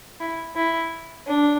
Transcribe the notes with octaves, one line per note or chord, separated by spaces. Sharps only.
E4
E4
D4